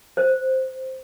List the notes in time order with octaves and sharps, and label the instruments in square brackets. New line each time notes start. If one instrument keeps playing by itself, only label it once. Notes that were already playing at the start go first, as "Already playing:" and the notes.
[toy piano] C5